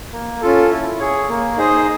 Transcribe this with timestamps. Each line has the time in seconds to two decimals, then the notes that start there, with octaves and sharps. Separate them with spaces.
0.12 A#3
0.41 C#4 F4 A4
0.70 E4
0.99 G#4 C#5
1.29 A#3
1.57 D#4 G#4 C5 D#5